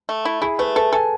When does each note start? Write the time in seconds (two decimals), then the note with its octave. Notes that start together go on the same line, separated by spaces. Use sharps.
0.09 A3
0.25 E4
0.42 E4 G#4
0.59 A3 B4
0.76 A4 B4
0.93 A4 G#5